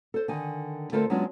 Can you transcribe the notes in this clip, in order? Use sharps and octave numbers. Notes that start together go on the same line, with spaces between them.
A4 C5
D3 D#3 G#5
D3 A3 F4 A4 A#4 C5
F#3 G#3 B3 C#4 D4 F4